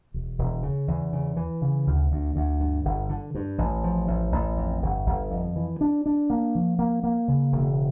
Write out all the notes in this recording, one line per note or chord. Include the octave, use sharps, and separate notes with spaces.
E1
E1
C#3
E2
C#3
E3
C#3
D2
D2
D2
G2
G1
D3
G2
A1
F3
A1
A1
F2
G1
G1
F2
E3
D4
D4
A#3
F3
A#3
A#3
C#3
E1